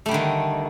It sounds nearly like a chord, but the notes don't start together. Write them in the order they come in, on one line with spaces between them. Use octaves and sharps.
A3 G3 D3 D#3